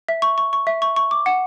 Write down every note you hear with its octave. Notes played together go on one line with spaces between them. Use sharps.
E5
C#6
C#6
C#6
E5
C#6
C#6
D6
F#5